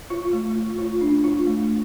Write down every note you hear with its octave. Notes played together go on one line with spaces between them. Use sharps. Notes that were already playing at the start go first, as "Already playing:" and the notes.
F4
A3
F4
F4
D4
F4
A3